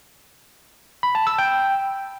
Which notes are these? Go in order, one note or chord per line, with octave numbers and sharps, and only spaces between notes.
B5
A5
E6
G5